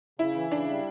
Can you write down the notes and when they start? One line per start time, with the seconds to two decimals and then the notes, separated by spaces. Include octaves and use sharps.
0.19 C#3 E4
0.35 E3
0.51 C#3 D4
0.68 G3